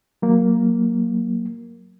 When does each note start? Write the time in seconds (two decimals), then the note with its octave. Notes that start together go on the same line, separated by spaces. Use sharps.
0.22 F#3 A#3